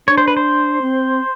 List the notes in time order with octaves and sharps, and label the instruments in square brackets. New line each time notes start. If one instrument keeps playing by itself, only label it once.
[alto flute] D4 [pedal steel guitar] C#5
[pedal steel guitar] C5
B4
C5
[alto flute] C4